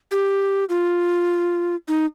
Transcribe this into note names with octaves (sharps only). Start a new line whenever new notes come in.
G4
F4
D#4